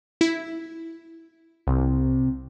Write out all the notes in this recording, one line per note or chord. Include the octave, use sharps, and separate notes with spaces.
E4
C2 C3